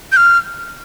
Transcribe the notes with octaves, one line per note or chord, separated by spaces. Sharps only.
G6
F6